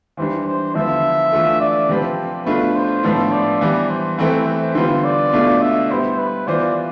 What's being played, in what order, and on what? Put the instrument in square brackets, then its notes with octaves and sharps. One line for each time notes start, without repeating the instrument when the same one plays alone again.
[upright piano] E3 G3 D4 [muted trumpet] C5
[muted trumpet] C5
[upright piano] D3 F3 B3 E4 [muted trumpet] E5
[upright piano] E3 A3 D4 F4 A4
[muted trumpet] D5
[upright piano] C3 F3 C4 G4 B4
[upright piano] B2 A3 D4 F4 [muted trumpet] B4
[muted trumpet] C5
[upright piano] A2 F3 B3 D4
[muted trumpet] D5
[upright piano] E3 G3 B3
[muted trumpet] C5
[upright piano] E3 A3 C4 E4 A4 [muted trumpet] B4
[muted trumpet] C5
[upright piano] D3 G3 B3 F4 [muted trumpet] C5
[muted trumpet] D5
[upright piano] B2 A3 D4 F4
[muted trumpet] E5
[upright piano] G3 B3 E4 [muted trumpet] C5
[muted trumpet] B4
[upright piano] E3 B3 F4 C5 [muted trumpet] D5